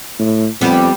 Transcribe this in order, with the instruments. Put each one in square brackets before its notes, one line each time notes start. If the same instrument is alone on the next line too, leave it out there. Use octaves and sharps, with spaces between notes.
[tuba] A2
[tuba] F2 [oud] G3 B3